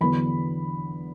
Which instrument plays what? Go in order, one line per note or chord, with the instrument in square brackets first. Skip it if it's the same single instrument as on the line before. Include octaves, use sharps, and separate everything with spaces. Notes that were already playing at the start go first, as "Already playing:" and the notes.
[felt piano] E2 D3 F#3 B3 D4 B5